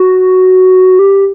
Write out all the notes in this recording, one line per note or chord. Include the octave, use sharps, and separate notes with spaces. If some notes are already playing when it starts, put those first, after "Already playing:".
Already playing: F#4
G4